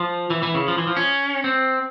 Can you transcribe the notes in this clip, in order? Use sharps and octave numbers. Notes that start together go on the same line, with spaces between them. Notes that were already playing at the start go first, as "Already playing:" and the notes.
Already playing: F3
E3
E3
C#3
F3
E3
F3
C#4
C4